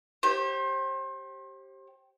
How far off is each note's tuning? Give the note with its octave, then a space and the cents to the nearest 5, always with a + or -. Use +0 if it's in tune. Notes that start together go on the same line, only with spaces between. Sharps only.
G4 -10 C5 +35